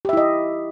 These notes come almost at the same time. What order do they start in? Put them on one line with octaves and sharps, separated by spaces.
G4 E5 E4 D#5